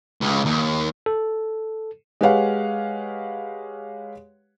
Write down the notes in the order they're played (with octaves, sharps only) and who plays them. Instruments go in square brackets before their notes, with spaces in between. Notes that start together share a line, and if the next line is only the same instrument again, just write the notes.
[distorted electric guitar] C#2
D#2
[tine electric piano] A4
[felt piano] G#3 G4 B4 C#5 F5 F#5